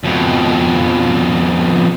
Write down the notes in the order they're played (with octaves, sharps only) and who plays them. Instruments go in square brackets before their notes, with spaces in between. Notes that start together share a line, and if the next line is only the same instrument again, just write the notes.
[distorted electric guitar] F2 B2